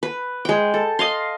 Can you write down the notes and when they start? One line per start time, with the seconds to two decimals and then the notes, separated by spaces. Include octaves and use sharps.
0.03 B4
0.45 G#3 G5
0.74 A4
0.99 D#5 F5 C6